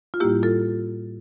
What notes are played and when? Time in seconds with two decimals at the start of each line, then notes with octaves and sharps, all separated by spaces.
0.14 F4
0.20 A2 G3 A#3 E4 G4
0.43 F4 A4